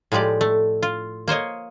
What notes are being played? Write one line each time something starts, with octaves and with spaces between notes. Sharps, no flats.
A2 F3 G#3 G4 D5
A3
F4
A#3 C5 C#5 D#5